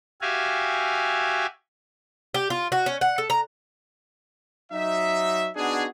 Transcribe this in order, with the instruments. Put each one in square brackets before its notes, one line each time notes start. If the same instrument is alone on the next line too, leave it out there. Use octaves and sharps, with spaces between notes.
[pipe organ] F#4 G4 E5 F5 G#5
[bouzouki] G4
F4
F#4
C#4
F#5
A4
A#5
[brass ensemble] F#3 D#4 E5
B3 D4 D#4 F#4 G#4